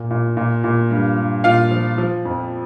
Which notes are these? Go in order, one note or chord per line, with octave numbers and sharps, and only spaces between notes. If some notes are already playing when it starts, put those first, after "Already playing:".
Already playing: A#2
A#2
A#2
A#2
G2
G2
A#2 F4 F5
F3
F3
F2